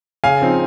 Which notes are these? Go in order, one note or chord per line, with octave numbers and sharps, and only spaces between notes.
C#3 F5 G#5
F3 C4 D#4